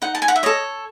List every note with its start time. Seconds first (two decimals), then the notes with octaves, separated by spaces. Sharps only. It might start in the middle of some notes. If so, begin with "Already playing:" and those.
0.02 D#4 F#5
0.15 A5
0.22 G#5
0.28 F#5
0.36 E5
0.43 A4 C#5 D#5